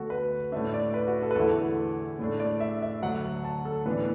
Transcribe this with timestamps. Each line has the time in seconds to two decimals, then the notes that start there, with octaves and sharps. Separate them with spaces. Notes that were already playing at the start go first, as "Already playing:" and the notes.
Already playing: D2 D3 B3 D4 F#4 A4
0.10 B4
0.52 A2 A3 D4 E5
0.74 D5
0.94 B4
1.08 F#4
1.22 A4
1.31 B4
1.35 E2 D3 A3 E4 A4
2.19 A2 A3 D4
2.40 D5
2.60 E5
2.82 E5
3.02 D2 D3 F#3 F#5
3.44 A5
3.65 A4
3.86 A2 E3 B3 D4 B4